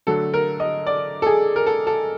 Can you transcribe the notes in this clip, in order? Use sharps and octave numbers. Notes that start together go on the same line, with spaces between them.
D3 F#3 A3 A4
A#4
D#5
D5
A4
G#4
A#4
A4
A4